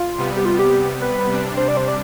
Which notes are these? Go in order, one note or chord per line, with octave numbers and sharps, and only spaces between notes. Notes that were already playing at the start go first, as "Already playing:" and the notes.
Already playing: F4
C3 G3 B3
G4
F4
G4
B4
C3 G3 D4
C5
D5
C5
D5